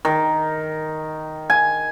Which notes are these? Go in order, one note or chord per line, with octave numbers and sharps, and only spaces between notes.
D#3
G#5